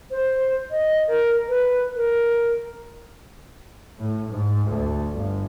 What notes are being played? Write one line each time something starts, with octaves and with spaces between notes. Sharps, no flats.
C5
D#5
A#4
B4
A#4
A2
G#2
D2
G1